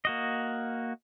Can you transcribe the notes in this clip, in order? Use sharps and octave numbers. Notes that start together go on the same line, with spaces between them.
A#3 F#4 D#5